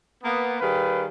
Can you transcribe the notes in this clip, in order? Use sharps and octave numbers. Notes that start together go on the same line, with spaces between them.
A#3 B3
D#3 G3 G#4 B4 F5